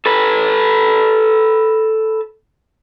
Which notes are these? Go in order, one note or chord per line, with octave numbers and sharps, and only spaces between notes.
A4 B4